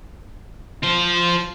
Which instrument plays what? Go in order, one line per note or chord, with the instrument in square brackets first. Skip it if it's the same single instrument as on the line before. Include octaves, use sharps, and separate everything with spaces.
[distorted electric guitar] F4 C5